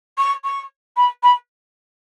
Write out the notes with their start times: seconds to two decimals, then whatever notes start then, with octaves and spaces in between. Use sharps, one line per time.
0.18 C#6
0.44 C#6
0.97 B5
1.23 B5